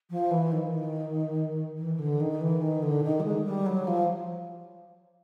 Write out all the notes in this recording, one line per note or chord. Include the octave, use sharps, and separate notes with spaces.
F3
E3
D#3
E3
D3
D#3
E3
D#3
D3
D#3
G3
G#3
G3
F#3
F3